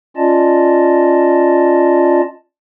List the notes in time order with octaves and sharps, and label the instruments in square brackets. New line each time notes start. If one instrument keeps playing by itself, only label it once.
[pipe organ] C#4 F4 D5 D#5 A5